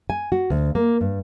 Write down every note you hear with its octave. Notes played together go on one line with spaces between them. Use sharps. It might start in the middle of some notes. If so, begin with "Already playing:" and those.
G#5
F#4
D2
A#3
G2